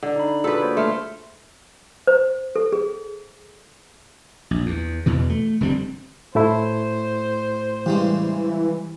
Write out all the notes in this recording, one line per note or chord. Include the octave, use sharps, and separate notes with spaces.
D3
D#4 B5
F4 F#4 G#4 A4 B4
A#3 C5 C#5
A3 C6 F6
C5
A4
G#4
A#1
E2
E2 B2 E3
A3
F1 D3 G3 C4
A2 A3 E4 C5
G2 C#3 E3 G#3